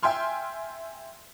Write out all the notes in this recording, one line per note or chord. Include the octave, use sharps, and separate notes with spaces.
E5 G5 G#5 C6 F6